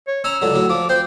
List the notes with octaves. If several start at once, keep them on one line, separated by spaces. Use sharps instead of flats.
C#5
C#4 A#5 E6
C#2 D3 F#3
A2 F#3
F3 D6
C4 C5